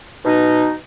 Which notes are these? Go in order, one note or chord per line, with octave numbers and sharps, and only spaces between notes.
B2 D#4